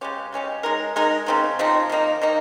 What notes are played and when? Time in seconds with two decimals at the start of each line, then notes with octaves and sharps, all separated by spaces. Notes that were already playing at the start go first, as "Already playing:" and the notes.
0.01 C#3 G#3 C#4 G4
0.32 C#3 G#3 C#4 G4
0.63 G#3 D#4 A#4
0.96 G#3 D#4 A#4
1.26 C#3 F3 C4 D#4
1.59 C#3 F3 C4 D#4
1.89 D#3 A#3 D#4
2.21 D#3 A#3 D#4